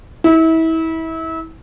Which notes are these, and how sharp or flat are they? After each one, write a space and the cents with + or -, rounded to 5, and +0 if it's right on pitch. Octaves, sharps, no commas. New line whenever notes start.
E4 -30